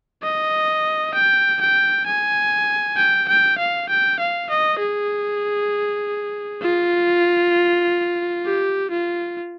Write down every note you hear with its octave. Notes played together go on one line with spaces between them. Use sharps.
D#5
G5
G5
G#5
G5
G5
F5
G5
F5
D#5
G#4
F4
G4
F4